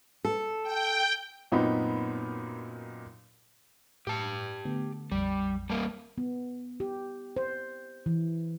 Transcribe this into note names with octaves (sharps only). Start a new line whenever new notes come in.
A4
G5
F#2 A#2 B3 C4 D#4 B5
A2 G4 A5
D3 A3 B3
A#1 F2 G3
G3 A#3 A5
B3
G4
C5
E3